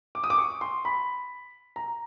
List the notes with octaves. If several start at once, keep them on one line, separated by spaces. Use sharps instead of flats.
D6
D#6
D6
C#6
C6
B5
A#5